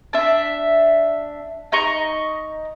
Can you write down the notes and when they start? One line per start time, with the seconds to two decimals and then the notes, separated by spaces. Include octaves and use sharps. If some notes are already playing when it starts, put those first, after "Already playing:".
0.13 D4 E5
1.72 D#4 D#5 A#5 C#6